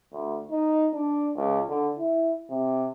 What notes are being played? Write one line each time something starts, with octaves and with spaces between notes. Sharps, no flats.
D2
D#4
D4
C#2
D3
E4
C3